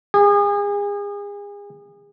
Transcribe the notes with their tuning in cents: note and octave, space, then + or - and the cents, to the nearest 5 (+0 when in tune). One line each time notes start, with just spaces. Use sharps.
G#4 -35